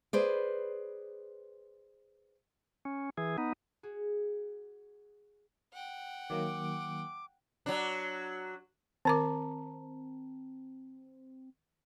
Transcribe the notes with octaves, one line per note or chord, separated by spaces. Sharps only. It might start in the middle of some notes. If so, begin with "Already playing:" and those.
G#4 B4 C5 D5
C#4
E3 G#4
B3 D#4
F#4 G#4
F#5 G5
D#3 F#3 A#3 D6
F#3 D4
D#3 C4 A#4 A5 A#5 D6